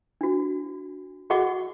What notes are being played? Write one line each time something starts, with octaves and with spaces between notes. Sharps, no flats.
D4 F#4
F#4 G#4 D#5 F#5 C#6 D6